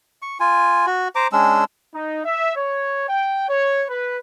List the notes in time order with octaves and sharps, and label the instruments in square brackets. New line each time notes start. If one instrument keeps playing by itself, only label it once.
[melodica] C#6
F4 G#5
F#4
C5 A#5 D6
G#3 C#4 D4 E6
[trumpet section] D#4
E5
C#5
G5
C#5
B4